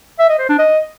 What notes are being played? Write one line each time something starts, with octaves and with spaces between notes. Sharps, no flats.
E5
D#5
C5
D4
D#5